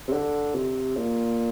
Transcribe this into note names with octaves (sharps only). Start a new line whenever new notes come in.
C3
D3
C3
A#2